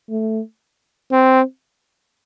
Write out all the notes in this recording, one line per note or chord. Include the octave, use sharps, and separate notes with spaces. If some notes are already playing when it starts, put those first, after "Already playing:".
A3
C4